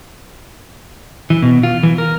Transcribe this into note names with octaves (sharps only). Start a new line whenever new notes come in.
E3
B2
F4
E3
A#4